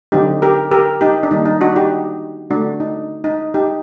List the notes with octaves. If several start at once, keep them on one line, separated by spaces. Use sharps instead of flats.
D3 F#3 C4 D#4 G4
G4 A#4
G4 A#4
D#4 G4
D4
D#3 G3 A#3 D#4
D#4
D4 F#4
D#4 G4
D3 A3 C4 D4 F#4
D#4
D#4
D#4 G4